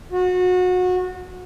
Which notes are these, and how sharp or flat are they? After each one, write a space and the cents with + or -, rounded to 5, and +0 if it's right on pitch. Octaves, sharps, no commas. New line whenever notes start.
F#4 -25